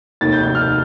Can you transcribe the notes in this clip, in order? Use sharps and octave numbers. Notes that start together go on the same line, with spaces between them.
F1 D#2 D#3 A6
G6
G6
F6